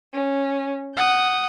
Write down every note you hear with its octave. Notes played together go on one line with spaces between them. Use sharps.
C#4
F#5 D#6 G6